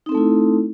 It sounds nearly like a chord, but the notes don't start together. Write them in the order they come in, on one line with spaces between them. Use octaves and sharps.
D#4 C4 A4 A3 E4